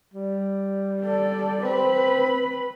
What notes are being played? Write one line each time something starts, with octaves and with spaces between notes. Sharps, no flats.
G3
A4 D5
C4 B4 B5